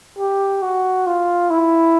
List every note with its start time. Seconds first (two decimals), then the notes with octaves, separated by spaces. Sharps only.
0.19 G4
0.62 F#4
1.07 F4
1.50 E4